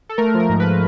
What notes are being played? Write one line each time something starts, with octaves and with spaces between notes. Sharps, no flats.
A4
A3 A#4
F3
A#4
G#2
B4